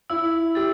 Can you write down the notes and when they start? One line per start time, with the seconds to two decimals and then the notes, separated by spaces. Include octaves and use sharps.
0.10 E4 E6
0.55 G4 A6